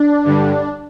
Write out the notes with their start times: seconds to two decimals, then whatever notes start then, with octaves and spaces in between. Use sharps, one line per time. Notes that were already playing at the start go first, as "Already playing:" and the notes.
Already playing: D4
0.24 G2 D3 G3